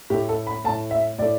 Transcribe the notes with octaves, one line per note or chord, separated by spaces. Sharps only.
A2 A3 G4
A4
B5
A2 A3 A5
E5
A2 A3 D5